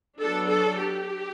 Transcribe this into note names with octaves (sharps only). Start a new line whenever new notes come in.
F#3 B3 D4 A4
A4
G4